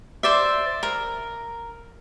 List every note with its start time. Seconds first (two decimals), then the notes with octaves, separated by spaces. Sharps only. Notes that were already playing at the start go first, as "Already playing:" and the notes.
0.23 C5 D5 E5
0.83 A#4